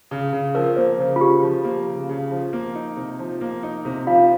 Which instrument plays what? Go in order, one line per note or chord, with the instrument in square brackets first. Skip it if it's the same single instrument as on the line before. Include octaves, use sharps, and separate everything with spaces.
[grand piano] C#3
C#3
[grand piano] F3 [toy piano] A#4
[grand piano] A#3 [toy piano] C5
[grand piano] C#3
[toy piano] F4
[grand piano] C#3 [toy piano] G4
[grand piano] F3
A#3
C#3
C#3
F3
A#3
D#4
C3
F3
A#3
D#4
C3
[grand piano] F3 [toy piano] F4 F5